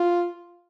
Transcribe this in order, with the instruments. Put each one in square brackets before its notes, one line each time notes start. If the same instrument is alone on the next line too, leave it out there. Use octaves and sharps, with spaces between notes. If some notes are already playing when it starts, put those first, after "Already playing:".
Already playing: [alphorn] F4